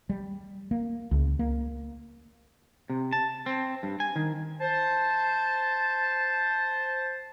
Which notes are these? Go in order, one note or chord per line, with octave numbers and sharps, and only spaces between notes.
G3
A#3
C#2
A#3
C3
A5
C4
G2
G#5
D#3
C5 A5